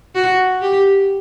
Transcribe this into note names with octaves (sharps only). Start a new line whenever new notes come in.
F#4
G4